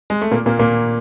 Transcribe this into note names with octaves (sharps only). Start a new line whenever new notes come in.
G#3
A3
A#2 A#3
A#2 A#3
A#2 A#3